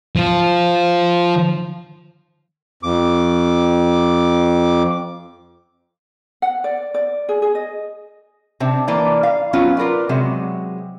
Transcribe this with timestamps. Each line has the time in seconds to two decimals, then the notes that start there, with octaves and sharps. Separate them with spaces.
0.16 F3 F4
2.83 F2 D6
6.42 F#5
6.64 D5
6.94 D5
7.29 G#4
7.42 G#4
7.55 D#5
8.60 C3 C4 D4
8.88 E3 A#3 D5
9.23 F5
9.53 F#3 B3 C#4 F4
9.77 F4 A#4 B4 D5
10.09 C3 F#3 G#3